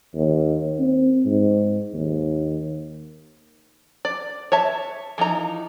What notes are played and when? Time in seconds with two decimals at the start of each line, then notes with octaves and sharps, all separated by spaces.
0.15 D#2
0.79 C4
1.26 G#2
1.94 D#2
4.05 D5
4.52 C#5 E5 A5
5.18 E3 F3 D#4 A#5